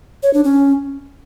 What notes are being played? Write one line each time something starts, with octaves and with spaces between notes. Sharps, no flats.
C#5
D4
C#4